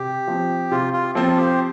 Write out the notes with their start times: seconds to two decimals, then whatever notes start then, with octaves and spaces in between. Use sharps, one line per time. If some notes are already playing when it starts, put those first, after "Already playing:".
Already playing: C3 G4
0.28 F3 C4
0.71 C3 F4
0.93 F4
1.15 F3 C4 F4 A4
1.37 G4 C5